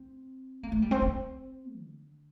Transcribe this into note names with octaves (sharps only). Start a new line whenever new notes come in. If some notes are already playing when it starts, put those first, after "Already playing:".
Already playing: C4
A#3
A3
G3
C4
C4
D3